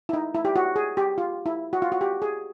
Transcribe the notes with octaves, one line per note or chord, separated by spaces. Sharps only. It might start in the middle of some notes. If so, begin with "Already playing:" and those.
E4
D#4
E4
G4
F#4
G#4
G4
F4
E4
F#4
F4
F#4
G4
G#4